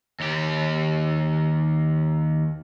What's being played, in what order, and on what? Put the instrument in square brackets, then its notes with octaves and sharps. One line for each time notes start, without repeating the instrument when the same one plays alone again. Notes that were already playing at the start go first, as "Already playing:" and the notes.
[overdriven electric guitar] D#2 G4